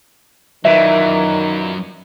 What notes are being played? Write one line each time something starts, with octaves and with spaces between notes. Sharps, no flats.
F#2 A#2 D#3 E3 F#3 E5